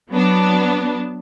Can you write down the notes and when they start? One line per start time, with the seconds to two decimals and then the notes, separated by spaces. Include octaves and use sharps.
0.10 F#3 B3 D4